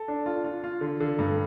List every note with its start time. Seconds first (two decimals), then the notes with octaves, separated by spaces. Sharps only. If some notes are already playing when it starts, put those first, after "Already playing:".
Already playing: A4
0.08 D4
0.26 F4
0.44 F4
0.64 F4
0.81 D3
1.00 D3
1.19 G2